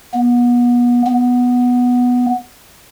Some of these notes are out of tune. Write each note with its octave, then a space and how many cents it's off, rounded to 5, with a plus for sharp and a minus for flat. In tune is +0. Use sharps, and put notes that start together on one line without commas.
B3 -30
B3 -5